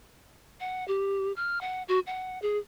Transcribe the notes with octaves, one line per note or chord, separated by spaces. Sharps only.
F#5
G4
F6
F#5
F#4
F#5
G#4